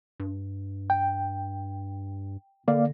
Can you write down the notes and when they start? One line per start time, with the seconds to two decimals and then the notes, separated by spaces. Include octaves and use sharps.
0.20 G2
0.90 G5
2.68 D3 A#3 D5 F5